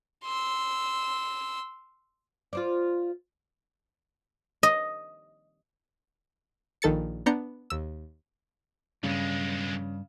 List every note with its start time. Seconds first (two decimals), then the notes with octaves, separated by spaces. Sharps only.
0.24 C6 E6
2.53 F4 C5 D5
4.63 D#5
6.82 A#1 D#3 A4 A6 C#7
7.26 B3 D4 A#5 G6 C#7
7.70 D#2 E6
9.03 B1 G2 C#3 G#3